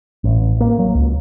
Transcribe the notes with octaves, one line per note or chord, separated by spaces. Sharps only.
A1
A#3
F#3
C#2